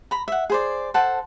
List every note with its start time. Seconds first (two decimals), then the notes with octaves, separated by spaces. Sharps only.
0.11 A#5 B5
0.28 E5 F#5
0.50 G#4 C5 D5
0.94 A4 C5 F#5 A5